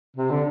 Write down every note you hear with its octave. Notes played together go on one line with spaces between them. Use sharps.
C3
D3